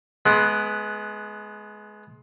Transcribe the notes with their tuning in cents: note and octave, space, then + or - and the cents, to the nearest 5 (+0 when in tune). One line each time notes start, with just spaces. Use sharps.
G#3 +25 B3 +0 D#6 +40